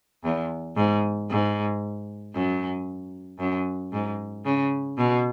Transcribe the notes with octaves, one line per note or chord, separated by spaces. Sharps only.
E2
G#2
G#2
F#2
F#2
G#2
C#3
B2